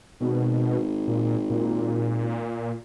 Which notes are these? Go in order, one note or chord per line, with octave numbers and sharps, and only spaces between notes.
G#1 B2
A#2
A#2